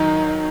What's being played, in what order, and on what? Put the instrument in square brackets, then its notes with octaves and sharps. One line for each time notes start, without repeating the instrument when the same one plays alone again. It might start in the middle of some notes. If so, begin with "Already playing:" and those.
Already playing: [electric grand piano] D#3 F#3 [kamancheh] D#4